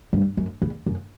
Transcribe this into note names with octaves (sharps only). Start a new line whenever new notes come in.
G2
F#2
E2
F#2